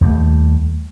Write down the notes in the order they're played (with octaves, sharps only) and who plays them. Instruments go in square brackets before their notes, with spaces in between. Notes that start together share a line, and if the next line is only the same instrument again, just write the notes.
[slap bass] D#2 G3 A3